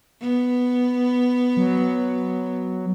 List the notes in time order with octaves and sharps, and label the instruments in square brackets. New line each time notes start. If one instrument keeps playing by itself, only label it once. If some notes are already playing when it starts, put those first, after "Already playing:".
[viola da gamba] B3
[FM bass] F#3